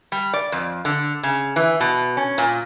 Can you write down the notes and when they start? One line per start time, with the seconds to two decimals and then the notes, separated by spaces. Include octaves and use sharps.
0.12 G3
0.33 D5
0.52 F2
0.85 D3
1.23 C#3
1.56 E3
1.81 B2
2.17 C#4
2.38 A#2